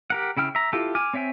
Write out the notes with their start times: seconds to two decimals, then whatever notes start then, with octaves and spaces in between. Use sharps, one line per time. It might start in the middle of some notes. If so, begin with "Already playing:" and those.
0.10 G4 A#4 F#5
0.37 C#3 E4 G5 F6
0.55 E5 A#5
0.73 E4 F4 G4 A4
0.95 G#5 D6 F6
1.13 C4 C#5 E5 G5 G#5